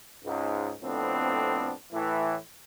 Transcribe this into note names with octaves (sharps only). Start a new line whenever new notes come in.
C#2 G#2
F2 A2 B3 C4 D4
A2 E3